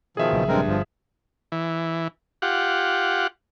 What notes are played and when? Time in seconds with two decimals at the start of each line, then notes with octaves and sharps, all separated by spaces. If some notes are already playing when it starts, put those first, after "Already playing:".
0.17 B2 D#3 F3 G#4 E5
0.32 A#1 C#3 F#3
0.48 G2 G#3 C4 A#4
0.68 G1 F3
1.52 E3
2.42 F4 G4 F#5